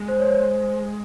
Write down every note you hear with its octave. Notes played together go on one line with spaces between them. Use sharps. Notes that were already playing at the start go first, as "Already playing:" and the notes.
Already playing: G#3
C5
C#5
C5